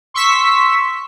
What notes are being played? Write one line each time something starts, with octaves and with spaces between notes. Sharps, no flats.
C6 C#6 E6 B6